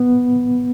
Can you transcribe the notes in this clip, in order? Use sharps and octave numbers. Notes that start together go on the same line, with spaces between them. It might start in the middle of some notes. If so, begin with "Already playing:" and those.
Already playing: B3